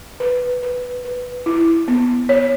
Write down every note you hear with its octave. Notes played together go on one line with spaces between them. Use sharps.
B4
B4
B4
E4
B3
C#5